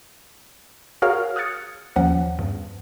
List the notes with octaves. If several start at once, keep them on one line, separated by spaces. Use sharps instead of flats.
F#4 G#4 A#4 C#5 F5 F6
D#6 F6 F#6 G#6 A6 C#7
D#2 F3 C#4 F#5
E2 G2